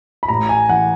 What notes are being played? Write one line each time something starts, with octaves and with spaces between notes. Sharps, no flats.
B5
A1 A#5
G#5
E3 F#5